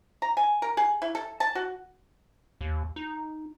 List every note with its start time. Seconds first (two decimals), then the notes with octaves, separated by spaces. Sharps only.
0.22 A#5
0.37 G#5
0.62 A#4
0.77 G#4
1.02 E4
1.15 A4
1.40 A5
1.55 F#4
2.61 D#2
2.96 D#4